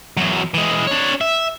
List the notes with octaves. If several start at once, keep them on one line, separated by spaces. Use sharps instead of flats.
E2 F#3
E3 G#3
D4 C#5
E5